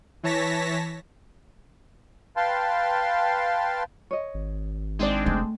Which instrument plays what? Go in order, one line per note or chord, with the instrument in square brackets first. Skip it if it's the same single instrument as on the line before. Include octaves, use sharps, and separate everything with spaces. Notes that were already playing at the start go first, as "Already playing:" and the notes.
[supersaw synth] E3 C#5 A5 A#6 B6
[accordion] B4 F5 G5 A5 C6
[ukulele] C#5 D#5
[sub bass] G#1
[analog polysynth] G#3 C4 D4 [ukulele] D#4 D5
[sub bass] F1 [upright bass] A3